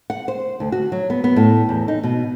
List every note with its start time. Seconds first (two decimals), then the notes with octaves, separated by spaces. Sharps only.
0.10 F#5
0.28 C5
0.60 D2
0.72 F#4
0.92 F#3
1.10 B3
1.24 B3
1.36 A2
1.69 E2
1.88 D#4
2.03 B2